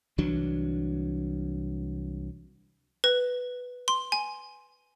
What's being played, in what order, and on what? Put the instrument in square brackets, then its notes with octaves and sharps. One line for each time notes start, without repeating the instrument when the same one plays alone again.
[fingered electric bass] C2 E3 F#3 D4
[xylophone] B4
C6
G#5